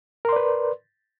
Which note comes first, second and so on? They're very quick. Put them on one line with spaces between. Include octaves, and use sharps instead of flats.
A#4 C6 D5 B4